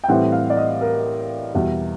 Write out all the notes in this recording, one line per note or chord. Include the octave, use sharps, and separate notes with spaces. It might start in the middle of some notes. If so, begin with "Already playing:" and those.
G5
A2 E3 G3 C4 E4 F#5
F5
D5
D#5
A#4
E2 B2 G3